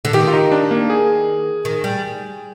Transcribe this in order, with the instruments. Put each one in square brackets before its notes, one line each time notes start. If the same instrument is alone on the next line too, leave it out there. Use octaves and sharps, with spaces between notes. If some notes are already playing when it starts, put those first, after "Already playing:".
[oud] D3
[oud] D#3 [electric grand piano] G4
[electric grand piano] F4
D#4
D4
A#3
G#4
[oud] D#3
G3